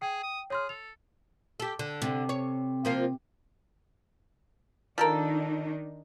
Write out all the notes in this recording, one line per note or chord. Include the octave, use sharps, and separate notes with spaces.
G#4 G5
D#6
G#4 C#5 C6 F6
A4 F7
G4 A4
D3
C3
C#5
F3 A#3 F4
D#3 F3 D4 D#4 A4 A#4